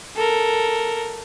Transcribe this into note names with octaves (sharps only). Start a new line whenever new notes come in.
A4 A#4